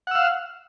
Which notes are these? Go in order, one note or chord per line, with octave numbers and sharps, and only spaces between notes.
F5 F#5 E6